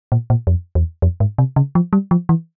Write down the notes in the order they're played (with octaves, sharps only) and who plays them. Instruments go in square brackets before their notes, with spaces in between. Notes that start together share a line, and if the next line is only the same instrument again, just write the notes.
[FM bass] A#2
A#2
F2
E2
F2
G#2
C3
C#3
F3
G3
F3
E3